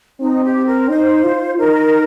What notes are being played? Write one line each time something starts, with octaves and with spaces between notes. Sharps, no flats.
C4 D#4
G4
A#4
D#4 C5
F4
D#4 A#4